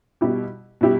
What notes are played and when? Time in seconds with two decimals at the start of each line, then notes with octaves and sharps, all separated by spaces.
0.21 B2 G3 E4 G4
0.81 B2 G3 E4 G4